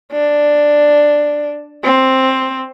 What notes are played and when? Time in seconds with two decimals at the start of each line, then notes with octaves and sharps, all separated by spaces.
0.12 D4
1.84 C4